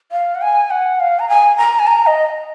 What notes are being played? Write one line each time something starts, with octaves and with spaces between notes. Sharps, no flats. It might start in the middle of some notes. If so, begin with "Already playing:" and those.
F5
F#5
G#5
F#5
F5
A#5
G#5
A#5
G#5
A#5
D#5